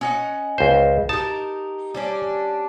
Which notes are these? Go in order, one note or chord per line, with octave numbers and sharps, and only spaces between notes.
C#4 D#5 F#5
C#2 C5
D#4 G4 A#4 A5
G3 C#4 D4